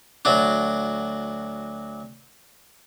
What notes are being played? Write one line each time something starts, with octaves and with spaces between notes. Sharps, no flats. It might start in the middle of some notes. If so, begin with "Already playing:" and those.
D2 F#3 D4